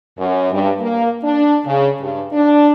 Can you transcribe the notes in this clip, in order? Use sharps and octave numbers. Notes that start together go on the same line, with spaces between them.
F#2
G2
A#3
D4
C#3
G2
D4